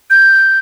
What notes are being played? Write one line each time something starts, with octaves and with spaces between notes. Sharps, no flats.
G6